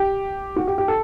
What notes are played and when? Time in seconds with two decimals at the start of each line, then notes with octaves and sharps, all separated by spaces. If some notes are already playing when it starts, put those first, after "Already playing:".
Already playing: G4
0.56 F#4
0.67 G4
0.78 G4
0.88 A4